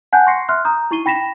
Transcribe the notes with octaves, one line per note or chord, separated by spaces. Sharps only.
F#5 G#5 A5 F#6 G6
C6 C#6 A#6 C7 C#7
E5 C6 F6 F#6
A#5 D#6 G6
D#4 E4 C#6 C7 D#7 G7
G5 B5 A#6 B6 E7 F7